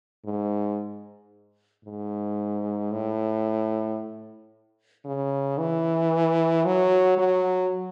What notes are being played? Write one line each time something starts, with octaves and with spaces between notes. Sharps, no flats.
G#2
G#2
A2
C#3
E3
F#3
F#3